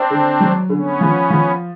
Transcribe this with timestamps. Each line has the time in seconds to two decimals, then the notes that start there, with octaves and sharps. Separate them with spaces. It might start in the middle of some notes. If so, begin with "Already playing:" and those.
Already playing: C4 D4
0.10 D3
0.40 F#3
0.69 D3 B3 C#4
1.01 F3
1.30 F3